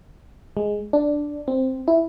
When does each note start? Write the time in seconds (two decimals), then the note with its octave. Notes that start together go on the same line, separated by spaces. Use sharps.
0.57 G#3
0.93 D4
1.48 C4
1.88 E4